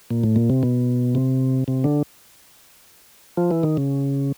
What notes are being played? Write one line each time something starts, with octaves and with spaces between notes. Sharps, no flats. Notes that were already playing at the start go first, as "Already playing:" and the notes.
A#2
A2
A#2
C3
B2
C3
C3
D3
F3
E3
D#3
C#3